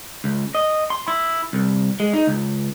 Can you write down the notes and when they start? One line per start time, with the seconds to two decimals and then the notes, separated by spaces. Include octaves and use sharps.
0.24 C#2
0.55 D#5
0.90 C6
1.08 E4
1.53 C2
2.00 G#3
2.13 D#4
2.27 C#2